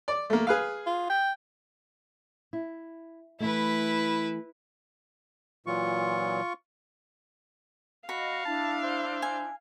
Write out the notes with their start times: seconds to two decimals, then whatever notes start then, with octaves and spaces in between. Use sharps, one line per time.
0.08 D5
0.30 A3 A#3
0.47 G#4 B4 F5
0.86 F4
1.10 G5
2.53 E4
3.40 E3 A3 E4 B4
5.66 A#2 E3 F#3 F4 C#6
8.09 F#4 D#5 F5 B5
8.45 D4 E4 A5
8.83 C5
9.22 G#5